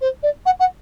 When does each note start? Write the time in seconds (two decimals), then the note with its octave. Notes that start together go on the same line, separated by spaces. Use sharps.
0.01 C5
0.23 D5
0.46 F#5
0.60 F#5